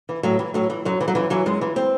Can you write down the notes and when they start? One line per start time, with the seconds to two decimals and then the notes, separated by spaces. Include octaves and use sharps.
0.09 E3
0.23 A2 F#3
0.39 E3
0.54 A2 F#3
0.70 E3
0.85 F#2 F#3
1.01 E3
1.08 F#3
1.15 F#2 E3
1.30 E3 F#3
1.46 F#2 G#3
1.61 E3
1.76 C4